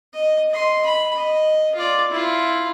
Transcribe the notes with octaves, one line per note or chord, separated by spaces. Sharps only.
D#5
D#5 C6
B5
D#5
F4 D5
E4 F4